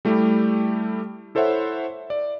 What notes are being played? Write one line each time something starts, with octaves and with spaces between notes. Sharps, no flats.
G3 A3 E4 G4
E4 A4 C5 C#5 E5 F#5
D5